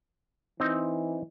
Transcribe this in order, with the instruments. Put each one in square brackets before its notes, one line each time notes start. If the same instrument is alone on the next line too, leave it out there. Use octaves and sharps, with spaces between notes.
[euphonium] E3 [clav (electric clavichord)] C4 D#4